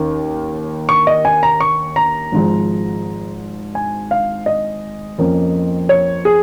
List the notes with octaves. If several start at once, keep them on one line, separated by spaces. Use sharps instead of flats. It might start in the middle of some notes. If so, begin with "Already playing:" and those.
Already playing: D#2 D#3 C#4
C#6
D#5
G#5
A#5
C#6
A#5
G#1 G#2 F3 G#3
G#5
F5
D#5
F2 F3 A#3 C#4
C#5
G#4